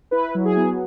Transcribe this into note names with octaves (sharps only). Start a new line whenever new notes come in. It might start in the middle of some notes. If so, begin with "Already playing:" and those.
E4 B4
F#3
G#4
B3